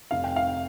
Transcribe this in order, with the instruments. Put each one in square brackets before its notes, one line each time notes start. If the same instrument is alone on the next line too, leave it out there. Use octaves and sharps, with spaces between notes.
[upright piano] F1 F5
G5
F5